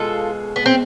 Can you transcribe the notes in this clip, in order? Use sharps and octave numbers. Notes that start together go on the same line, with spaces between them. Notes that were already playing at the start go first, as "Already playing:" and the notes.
Already playing: B2 G#3 F4 A4
B3
C4